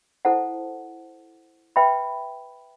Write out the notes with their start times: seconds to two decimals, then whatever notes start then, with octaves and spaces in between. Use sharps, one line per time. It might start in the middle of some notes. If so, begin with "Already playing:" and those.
0.25 E4 A4 C5 F#5 A5
1.76 B4 E5 G5 B5